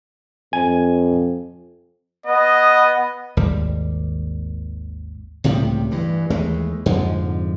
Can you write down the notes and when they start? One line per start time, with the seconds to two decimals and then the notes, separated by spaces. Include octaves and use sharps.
0.53 F2 G#5
2.26 B3 D#5
3.37 G#1 D#2 G3
5.44 C#2 A2 C3 G3
5.91 G2 E3
6.30 D#2 E3 G#3 A3
6.86 F2 G#2 D3 F3